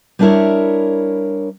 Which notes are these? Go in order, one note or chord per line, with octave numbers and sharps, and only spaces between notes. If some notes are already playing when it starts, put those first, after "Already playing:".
G3 B3 D4 E4 A#4 C#5